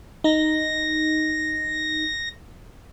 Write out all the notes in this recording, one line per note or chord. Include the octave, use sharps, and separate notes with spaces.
D#4 A#6